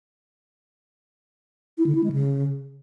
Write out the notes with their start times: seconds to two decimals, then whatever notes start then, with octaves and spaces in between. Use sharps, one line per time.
1.78 E4
1.87 D3
1.95 E4
2.04 G#3
2.12 C#3